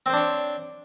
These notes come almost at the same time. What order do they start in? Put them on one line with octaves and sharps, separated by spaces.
C4 C5 D4 C#5